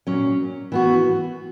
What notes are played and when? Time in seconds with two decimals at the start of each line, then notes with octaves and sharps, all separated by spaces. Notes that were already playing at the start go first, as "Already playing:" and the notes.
0.07 A#2 F#3 C#4
0.72 E3 B3 F#4